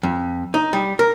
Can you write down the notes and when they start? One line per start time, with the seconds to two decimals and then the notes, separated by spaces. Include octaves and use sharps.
0.03 F2
0.54 D#4
0.73 G3
0.99 A#4